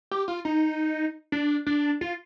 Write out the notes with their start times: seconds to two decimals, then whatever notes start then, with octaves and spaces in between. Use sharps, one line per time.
0.11 G4
0.28 F4
0.45 D#4
1.32 D4
1.67 D4
2.01 F4